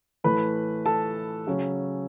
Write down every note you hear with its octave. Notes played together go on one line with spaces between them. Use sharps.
A2 E3 A3 B4 B5
A4 A5
C#3 F#3 C#4